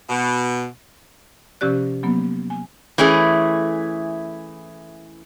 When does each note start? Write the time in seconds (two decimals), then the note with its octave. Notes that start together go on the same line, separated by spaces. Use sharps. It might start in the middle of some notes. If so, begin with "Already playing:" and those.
0.09 B2
1.61 C3 F3 C#4 G4 D5 F#6
2.03 F#3 A#3 B3
2.50 G#5
2.98 E3 A3 C#4 E4 G#4